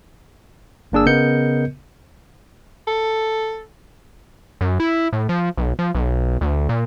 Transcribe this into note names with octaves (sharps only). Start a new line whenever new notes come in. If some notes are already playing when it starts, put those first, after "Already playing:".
G1 A#3 D4 G#4 E6
C#3 B3 A#4 D#5 G6 C#7
A4
F#2
E4
A2
F3
B1
F3
B1
D2
A#2